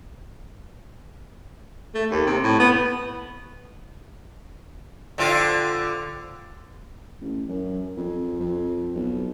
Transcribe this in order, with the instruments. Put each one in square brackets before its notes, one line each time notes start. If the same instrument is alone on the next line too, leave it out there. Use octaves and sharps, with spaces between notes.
[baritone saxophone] A3
D#2
C3
A2
B3
[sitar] D3 C4 F4
[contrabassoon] A1
F#2
F2
F2
B1